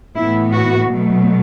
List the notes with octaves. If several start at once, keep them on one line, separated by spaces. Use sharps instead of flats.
A2 E3 B3 E4
F#4
B2 F#3 A3